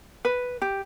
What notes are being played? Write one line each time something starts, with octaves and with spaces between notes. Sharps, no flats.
B4
G4